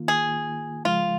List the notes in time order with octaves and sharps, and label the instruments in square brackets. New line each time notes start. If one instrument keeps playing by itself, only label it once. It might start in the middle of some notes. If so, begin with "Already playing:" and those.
Already playing: [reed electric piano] D#3 A#3 F4
[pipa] G#4
[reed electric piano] C#3 F3 G#3 [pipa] F4